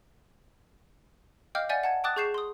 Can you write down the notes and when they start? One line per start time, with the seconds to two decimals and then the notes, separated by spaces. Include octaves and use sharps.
1.55 D#5 F5 G5 D6 F6 G6
1.69 D5 E5 F#5 G#5 G6 A6
1.84 F#5 A5 G#6
2.04 G5 A5 D6 D#6 F#6 A6
2.16 G#4 C#6 G6 C7 E7
2.34 C6 D#6